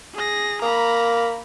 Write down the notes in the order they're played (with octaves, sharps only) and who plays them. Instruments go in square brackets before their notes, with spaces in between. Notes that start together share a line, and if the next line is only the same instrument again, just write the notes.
[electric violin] G#4 A#6
[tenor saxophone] A#3 [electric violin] A#5 B5